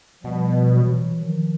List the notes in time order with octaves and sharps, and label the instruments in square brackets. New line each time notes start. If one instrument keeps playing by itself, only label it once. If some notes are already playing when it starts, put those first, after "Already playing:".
[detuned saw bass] B2 [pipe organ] F3 G3
[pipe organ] E3 F#3
D#3 F3